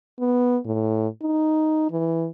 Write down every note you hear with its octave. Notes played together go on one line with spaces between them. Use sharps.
B3
A2
D#4
E3